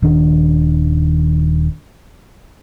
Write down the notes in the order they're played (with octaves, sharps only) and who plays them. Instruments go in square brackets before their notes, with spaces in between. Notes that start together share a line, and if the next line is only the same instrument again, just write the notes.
[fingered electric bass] D#1 D#3 D4